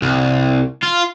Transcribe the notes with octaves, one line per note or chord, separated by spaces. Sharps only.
C2
F4